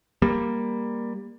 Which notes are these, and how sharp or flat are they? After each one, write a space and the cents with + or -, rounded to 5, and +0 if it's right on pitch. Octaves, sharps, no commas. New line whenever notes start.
G3 +20 A#3 +10